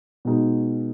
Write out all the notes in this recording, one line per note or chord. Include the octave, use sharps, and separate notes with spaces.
B2 G#3 D#4